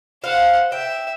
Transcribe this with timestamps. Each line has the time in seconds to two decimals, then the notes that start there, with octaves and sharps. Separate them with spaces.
0.24 C5 F5 F#5
0.72 E5 G5